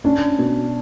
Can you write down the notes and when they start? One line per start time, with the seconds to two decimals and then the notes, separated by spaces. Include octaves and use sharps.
0.04 C#4 D4
0.38 B2